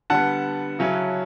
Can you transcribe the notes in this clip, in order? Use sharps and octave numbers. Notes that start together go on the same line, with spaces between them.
D3 G3 B3 F#5 A5
C#3 F#3 C#4 E4